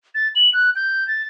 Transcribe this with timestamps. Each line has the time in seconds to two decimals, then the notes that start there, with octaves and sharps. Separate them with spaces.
0.15 A6
0.36 F#7
0.54 F#6
0.76 G6
1.08 A6